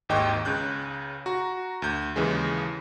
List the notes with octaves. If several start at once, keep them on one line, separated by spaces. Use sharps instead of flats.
G#1 D#2 G#2 D#5 G5 C#6
C#2 C#3 F#6 G6
F#4 A#5
D2 G6
D#2 C#3 E3 G#3